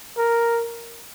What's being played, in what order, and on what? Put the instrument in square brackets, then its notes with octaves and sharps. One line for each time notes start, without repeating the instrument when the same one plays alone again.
[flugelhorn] A#4